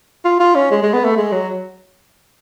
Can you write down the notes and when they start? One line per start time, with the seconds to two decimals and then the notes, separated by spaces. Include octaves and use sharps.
0.25 F4
0.40 F4
0.55 C#4
0.71 G#3
0.82 G#3
0.94 B3
1.05 A3
1.17 G#3
1.32 F#3